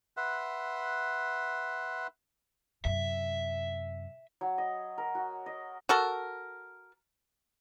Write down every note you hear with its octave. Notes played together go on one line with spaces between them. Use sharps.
B4 E5 F#5 C6
F#2 C3 E5
F#3
D#5
A#4
F#4
D#5
F#4 A4 A#4